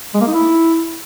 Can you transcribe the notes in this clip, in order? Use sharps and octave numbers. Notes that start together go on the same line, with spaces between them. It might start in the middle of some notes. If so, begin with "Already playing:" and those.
G#3
A#3
D#4
E4